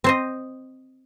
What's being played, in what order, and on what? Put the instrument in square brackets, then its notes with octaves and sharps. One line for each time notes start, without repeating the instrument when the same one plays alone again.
[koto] C4 C5 D#5